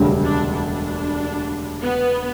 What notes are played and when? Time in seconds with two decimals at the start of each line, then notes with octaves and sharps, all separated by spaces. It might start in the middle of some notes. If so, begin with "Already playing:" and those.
Already playing: E1 D2 C#3 G3
0.23 D4
0.54 D4
1.82 B3